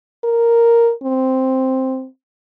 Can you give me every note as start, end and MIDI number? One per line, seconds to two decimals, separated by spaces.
0.24 0.92 70
1.03 2.07 60